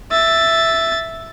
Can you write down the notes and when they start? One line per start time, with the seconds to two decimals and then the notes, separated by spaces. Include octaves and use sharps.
0.11 E5 A6